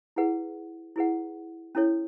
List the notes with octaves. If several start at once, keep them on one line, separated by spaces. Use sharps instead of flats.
E4 G#4 B4 F#5
E4 G#4 B4 F#5
C#4 E4 A4 C#5